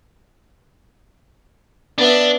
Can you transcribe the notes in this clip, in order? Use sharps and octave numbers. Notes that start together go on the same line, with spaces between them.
B3 D4 E5